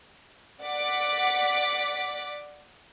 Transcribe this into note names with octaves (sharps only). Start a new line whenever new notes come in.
D5 F#5 D6 B6